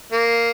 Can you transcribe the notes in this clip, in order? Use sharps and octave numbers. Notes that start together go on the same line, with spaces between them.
A#3